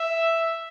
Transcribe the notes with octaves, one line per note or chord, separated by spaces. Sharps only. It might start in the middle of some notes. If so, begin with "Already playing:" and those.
Already playing: E5